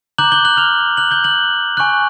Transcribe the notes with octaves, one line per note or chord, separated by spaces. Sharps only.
A#5 D6 F#6 G6 F#7
G6 G7
F#6 F#7
F6 F7
F#6 F#7
G6 G7
F#6 F#7
G#5 C#6 F#6